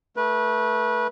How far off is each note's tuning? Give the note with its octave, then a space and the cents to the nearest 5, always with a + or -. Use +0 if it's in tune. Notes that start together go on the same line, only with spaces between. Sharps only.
A3 +0 B4 -25